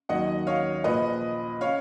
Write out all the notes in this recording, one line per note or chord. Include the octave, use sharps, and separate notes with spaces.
D#2 D#3 F#3 D#5 F#5
C#5 F5
A#1 A#2 F3 B4 D#5
C#3 C#5 F5